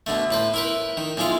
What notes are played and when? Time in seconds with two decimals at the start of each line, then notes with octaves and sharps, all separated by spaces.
0.06 B2 D3 A3
0.31 A2 B4 C5
0.54 E4 A#4 B4
0.97 D#3
1.17 B1 G#3 E4 F4 F5